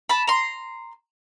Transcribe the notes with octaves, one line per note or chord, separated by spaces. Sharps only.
A5 B5
A#5 C6